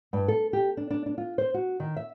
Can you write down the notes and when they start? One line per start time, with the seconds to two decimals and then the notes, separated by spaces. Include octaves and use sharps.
0.13 G2
0.28 A4
0.53 G4
0.77 D4
0.90 D4
1.06 D4
1.18 F4
1.38 C5
1.54 F#4
1.80 D#3
1.97 E5